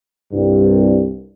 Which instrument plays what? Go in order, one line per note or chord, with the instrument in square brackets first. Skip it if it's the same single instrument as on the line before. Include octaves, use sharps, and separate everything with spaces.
[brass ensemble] C2 G2